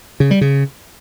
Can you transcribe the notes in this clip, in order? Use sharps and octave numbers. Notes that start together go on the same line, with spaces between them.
C#3
G3
C#3